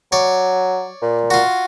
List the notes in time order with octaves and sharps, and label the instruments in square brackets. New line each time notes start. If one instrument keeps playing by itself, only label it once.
[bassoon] F#3 [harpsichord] C#5 D5
[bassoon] A#2
[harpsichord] F4 F#4